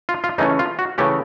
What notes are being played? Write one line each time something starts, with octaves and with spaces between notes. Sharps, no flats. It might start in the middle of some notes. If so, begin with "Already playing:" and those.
F4
F4
C#3 E3 A3 C#4 D#4
F4
F#4
C#3 E3 A3 C#4 G4